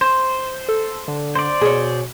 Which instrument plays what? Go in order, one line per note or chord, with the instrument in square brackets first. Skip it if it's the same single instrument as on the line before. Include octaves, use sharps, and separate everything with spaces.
[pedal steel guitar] C5
[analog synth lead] A4
D3
[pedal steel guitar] C5 D5
[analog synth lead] B2 [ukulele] G#4 C#5